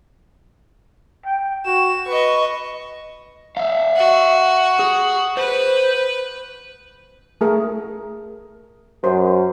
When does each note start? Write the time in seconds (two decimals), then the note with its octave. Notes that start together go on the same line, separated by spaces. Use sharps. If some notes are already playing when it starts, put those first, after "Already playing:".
1.25 G5
1.66 F#4 E7
2.07 B4 D#5 C#6
3.57 E5 F5
3.96 F#4
4.79 G#4
5.37 B4 C5
7.41 A3 G#4 A#4
9.04 F#2 C5